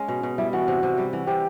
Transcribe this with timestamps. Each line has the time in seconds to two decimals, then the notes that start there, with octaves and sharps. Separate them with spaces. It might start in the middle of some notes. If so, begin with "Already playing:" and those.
Already playing: G#3 C#4
0.08 B2
0.23 B2
0.38 G3 E4
0.53 E3 F#4
0.68 C3
0.83 C3
0.98 G3
1.13 E3
1.27 C3 G4